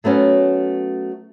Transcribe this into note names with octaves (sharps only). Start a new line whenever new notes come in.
F#3 A3 B3 C#4 F#4